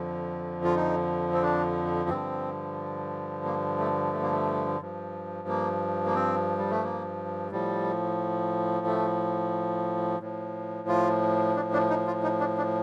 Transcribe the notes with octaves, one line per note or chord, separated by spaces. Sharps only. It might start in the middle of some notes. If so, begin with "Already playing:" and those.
Already playing: F2 D3 F3
F4
D#4
C4
D4
G2 D3 F3 C4
A#3
A3
A3
A#3
A3
G2 F3
A#3
A#3
C4
G3
A3
A#3
A2 F3 G3
A3
A2 F3
F4
D4
D4
D#4
F4
D#4
D4
D4